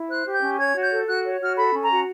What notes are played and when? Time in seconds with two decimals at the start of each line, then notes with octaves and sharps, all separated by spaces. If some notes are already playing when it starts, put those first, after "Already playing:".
Already playing: E4
0.09 C5 F#6
0.25 G4
0.34 G6
0.42 C#4
0.59 C#5 G#6
0.76 F#4
0.84 G6
0.91 A4
1.08 F#4 F#6
1.25 C#5
1.41 F#4 F6
1.57 A4 B5
1.74 C#4
1.82 A#5
1.91 F#4